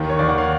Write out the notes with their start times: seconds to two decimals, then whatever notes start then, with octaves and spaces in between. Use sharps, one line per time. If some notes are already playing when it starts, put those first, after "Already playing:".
Already playing: D#2 D#3
0.10 C#5
0.19 D#2 D#3 D5
0.29 F#5
0.38 F5